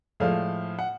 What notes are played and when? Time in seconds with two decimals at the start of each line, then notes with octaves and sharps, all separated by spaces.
0.20 A2 F3 G#3 F5
0.79 F#5